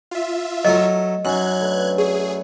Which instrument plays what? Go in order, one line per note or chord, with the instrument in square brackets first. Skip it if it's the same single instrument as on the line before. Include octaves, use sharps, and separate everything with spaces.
[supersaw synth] F4 E5
[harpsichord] F#3 A3 A#4 [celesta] D#5
[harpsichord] F#2 [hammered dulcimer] C#4 D#4 [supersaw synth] F#6 G#6
[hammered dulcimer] D3 A3 B4
[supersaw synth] G#4 [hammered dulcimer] C#5 E5